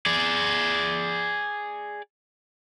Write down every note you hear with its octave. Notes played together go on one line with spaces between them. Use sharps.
G#4 D5